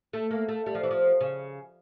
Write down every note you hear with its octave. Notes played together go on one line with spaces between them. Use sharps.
A3
A#3
A3
G3
F3
E3
F3
C#3